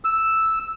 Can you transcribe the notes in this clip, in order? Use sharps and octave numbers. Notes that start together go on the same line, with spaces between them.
E6